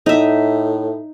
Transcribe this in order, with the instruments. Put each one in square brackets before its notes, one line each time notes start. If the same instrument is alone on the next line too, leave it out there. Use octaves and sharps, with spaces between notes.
[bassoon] A2 [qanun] D#4 E5